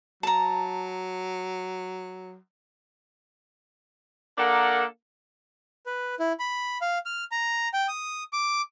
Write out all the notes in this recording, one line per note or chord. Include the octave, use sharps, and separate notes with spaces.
F#3 A5 A#5
A#3 D4 A4 A#4 F#5
B4
E4
B5
F5
F6
A#5
G5
D#6
D6